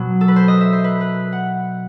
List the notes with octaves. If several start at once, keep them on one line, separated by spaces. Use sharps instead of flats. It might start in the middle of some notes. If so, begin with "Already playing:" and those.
Already playing: B2 F#3
A4
B4
C5
D#5
E5
C5
B4
B4
F#5